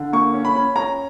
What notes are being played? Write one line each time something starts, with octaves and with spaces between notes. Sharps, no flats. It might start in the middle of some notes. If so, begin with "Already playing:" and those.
Already playing: D3
A#3 C#6
C#4
B5
C#4
C#4 A#5